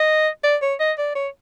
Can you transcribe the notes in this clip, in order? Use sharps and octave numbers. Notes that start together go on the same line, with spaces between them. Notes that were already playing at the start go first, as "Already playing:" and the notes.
Already playing: D#5
D5
C#5
D#5
D5
C#5